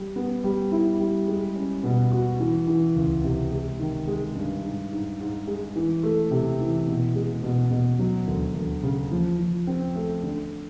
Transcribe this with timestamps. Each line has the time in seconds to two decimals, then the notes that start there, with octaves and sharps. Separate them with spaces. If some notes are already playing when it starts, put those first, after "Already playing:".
Already playing: G3
0.16 B3
0.44 G3
0.72 E4
1.00 G3
1.28 G#3
1.56 C#4
1.84 B2
2.12 F#4
2.40 E3
2.67 E3
2.96 C#2
3.24 C3
3.52 G#3
3.79 D#3
4.08 G#3
4.35 G2
4.64 G#2
4.91 G#2
5.20 G#2
5.47 G#3
5.76 E3
6.03 A3
6.31 C3
6.60 E3
6.87 B2
7.15 G#3
7.43 B2
7.71 B2
7.99 F#3
8.27 D2
8.55 D2
8.83 C#3
9.11 F3
9.39 F3
9.67 C4
9.95 A3
10.23 D3